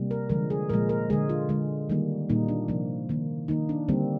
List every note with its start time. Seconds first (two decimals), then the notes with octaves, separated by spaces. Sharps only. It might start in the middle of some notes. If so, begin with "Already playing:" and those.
Already playing: C3 G3 A#3
0.11 A#4
0.29 D3 F3 G#3 A#4
0.50 G#4
0.69 A#2 F3 G#3 A#4
0.89 A#4
1.10 G#3 G#4
1.13 D3
1.29 F4
1.49 D3 G#3
1.90 D#3 G3 A#3
2.29 A#2 G3 A#3 D#4
2.48 D4
2.68 C3 F3 A#3
3.09 D#3 A#3
3.48 D#3 A#3 D#4
3.69 D4
3.89 D3 G3 A#3 C4